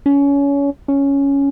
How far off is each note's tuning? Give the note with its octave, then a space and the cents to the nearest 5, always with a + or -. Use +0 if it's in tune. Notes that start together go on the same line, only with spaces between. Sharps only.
C#4 +25
C#4 +5